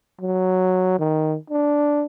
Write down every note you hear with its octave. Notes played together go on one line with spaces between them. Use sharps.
F#3
D#3
D4